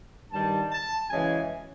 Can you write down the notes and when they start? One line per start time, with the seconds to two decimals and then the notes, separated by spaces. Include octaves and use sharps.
0.32 G2 D#3 G3 A5
0.71 A5
1.10 F#2 C#3 E3 G#3 G#5